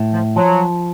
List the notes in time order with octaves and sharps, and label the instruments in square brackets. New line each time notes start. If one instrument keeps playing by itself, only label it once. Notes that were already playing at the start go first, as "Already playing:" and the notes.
Already playing: [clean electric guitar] A2
[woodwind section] F3
[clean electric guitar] F3 [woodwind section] F#3